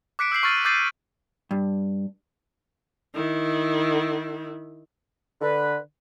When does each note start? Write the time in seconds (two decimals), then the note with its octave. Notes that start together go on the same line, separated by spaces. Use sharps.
0.19 D6 F#6 B6 C#7 D7
0.32 E6 G6 C7 F#7
0.43 C#6 F6 A6 D#7
0.65 D6 E6 G6 A6 C7 D#7
1.51 G2
3.14 D#3 E4
5.41 D3 B4